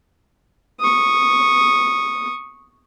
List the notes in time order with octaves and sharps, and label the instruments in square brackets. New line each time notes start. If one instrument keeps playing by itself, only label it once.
[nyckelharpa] C#6 D#6